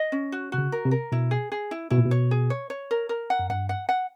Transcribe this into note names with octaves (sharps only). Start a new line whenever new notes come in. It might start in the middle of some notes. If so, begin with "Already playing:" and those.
Already playing: D#5
C#4
F#4
C3 F#4
C#3
A#4
C3
A#4
B2 E4
G#4
G#4
E4
B2 E4
A#2
B2
C#5
G#4
C#5
C#5
A#4
A#4
F#5
F#2
G2 F#5
F#5
F#5